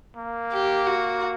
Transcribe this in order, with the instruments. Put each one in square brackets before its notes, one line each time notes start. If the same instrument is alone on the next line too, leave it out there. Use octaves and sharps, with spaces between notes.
[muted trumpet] A#3
[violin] G4
F#4